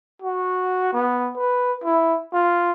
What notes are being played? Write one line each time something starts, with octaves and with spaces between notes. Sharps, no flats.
F#4
B3
B4
E4
F4